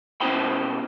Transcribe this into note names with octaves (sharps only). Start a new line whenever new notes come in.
B2 C#4 E4 C5 G5 B5